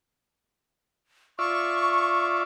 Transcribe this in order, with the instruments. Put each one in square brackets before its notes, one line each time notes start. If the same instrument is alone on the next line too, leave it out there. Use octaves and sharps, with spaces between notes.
[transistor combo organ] F4 D5 E5 [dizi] C#6